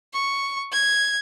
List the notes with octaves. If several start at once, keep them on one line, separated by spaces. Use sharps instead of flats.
C#6
G#6